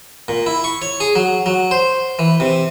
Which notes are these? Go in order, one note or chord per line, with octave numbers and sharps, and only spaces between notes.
A#2
E4
C#6
C#5
G#4
F#3
F#3
C5
E3
C3